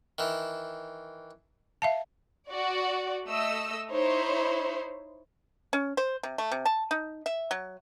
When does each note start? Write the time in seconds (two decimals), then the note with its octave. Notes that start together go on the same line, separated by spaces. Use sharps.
0.18 D#3 E3
1.82 E5 F5 A5
2.48 F#4 D5
3.26 A3 D#5 E6
3.91 D#4 E4 C5 C#5
5.73 C#4
5.97 C5
6.23 C3
6.38 A3
6.51 C3
6.65 A5
6.91 D#4
7.26 E5
7.51 F#3